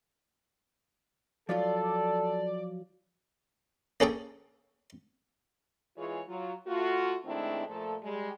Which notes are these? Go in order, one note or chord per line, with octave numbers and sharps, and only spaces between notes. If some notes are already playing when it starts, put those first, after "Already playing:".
F3 F#3 F4 A4 D5
A#3 C#4 G#4 A4 G5
E3 G#3 F4 G#4 C#5
F#3 F4
A3 F4 F#4
D#3 G#3 A3 C4 D4 E4
A#2 F3 A3 A4
G3 G#3